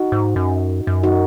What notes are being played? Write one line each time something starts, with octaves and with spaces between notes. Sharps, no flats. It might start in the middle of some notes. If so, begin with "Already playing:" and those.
Already playing: D#4 F#4
G#2
F#2
F#2
D#4 F#4